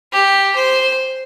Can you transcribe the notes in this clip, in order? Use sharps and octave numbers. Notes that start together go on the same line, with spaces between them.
G4
C5